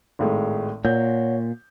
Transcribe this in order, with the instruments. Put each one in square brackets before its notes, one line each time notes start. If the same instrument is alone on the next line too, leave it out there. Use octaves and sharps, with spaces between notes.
[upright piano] G#1 A2 G#3
[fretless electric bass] A#2 [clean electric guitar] C#5 F#5 [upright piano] G6